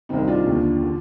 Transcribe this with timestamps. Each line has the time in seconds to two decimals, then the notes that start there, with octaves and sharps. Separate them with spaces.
0.09 C2 C3 D#3 C4 D#4
0.28 D4 F4
0.46 D#2 D3
0.83 D3